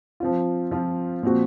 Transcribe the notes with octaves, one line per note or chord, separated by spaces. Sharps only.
F3 C4 F4
F3 C4 F4
A#2 F3 C4 F#4